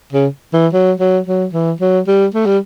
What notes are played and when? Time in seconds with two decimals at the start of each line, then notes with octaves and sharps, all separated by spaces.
0.13 C#3
0.53 E3
0.73 F#3
1.00 F#3
1.27 F#3
1.53 E3
1.81 F#3
2.07 G3
2.34 A3
2.46 G3